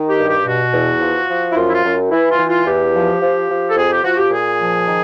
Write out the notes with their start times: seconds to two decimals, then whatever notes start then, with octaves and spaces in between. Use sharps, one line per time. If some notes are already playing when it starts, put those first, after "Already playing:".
Already playing: D#3
0.09 G4
0.19 G2
0.28 G4
0.46 B2 F#4
0.72 E2
1.00 F3
1.28 F3
1.51 E4
1.56 F#2 F4
1.68 E4
1.74 F4
1.84 F#2
2.10 E3 E4
2.29 F4
2.38 E3
2.48 F4
2.66 E2 G4
2.93 F3
3.21 F3
3.48 F3
3.70 A4
3.76 F2 G#4
3.90 G4
4.04 F3 F#4
4.17 G4
4.31 A#2 G#4
4.59 F3
4.86 D#3